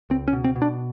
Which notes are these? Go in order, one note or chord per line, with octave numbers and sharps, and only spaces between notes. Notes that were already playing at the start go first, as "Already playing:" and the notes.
C#2 C4
C#4
B2
C4
B2
D4